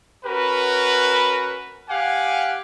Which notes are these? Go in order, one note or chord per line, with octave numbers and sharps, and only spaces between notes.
C#4 F#4 A#4 B4
G4 F5 F#5 G#5 D6